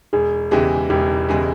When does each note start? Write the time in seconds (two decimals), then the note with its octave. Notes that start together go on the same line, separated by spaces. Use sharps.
0.13 E1 G#4
0.51 E2 C#3 E3 G#3 G4
0.90 E1 G4
1.29 E2 C#3 E3 G#3 G4